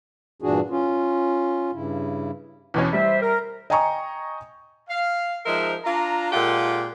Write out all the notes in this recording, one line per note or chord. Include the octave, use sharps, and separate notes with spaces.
G2 A#2 E3 D4 F#4 G#4
C#4 F4
G2 C#3 E4
E2 B2 C#4
G3 C5 E5
A#4
D#5 G5 G#5 A#5 C#6 D#6
F5
F3 G#3 D#4 A#4 C5 E5
D4 F4 A#5
A#2 G#3 F4 G4 A4 F#5